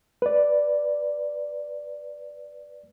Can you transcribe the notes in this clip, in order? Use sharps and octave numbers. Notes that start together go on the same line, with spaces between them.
B4 D5